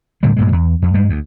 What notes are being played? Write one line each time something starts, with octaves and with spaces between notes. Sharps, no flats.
A2 D3 G3 G#3
G2 A#2 G#3
E2
F2
G2 G3 G#3
D2